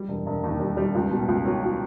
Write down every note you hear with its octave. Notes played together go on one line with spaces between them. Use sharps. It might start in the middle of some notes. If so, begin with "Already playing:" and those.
Already playing: G3
E1
E1
D#2
G3
G3
C#2
B2
C#2
F#3
F#3